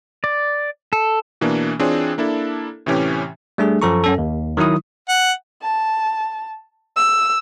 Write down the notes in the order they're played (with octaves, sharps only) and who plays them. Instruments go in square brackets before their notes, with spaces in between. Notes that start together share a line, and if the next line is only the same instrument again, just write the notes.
[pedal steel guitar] D5
A4
[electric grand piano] B2 E3 A#3 D4
E3 C4 D4 F4 G#4 C#5
A#3 D4 E4 A4
A2 C3 E3 C#4 G4
[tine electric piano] G3 A3 D4 G#4
F#2 F3 A4 A#5 C#6
F#2 C#4 A4
D#2
D#3 F#3 D#4 E4 D#6
[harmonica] F#5
[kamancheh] A5
E6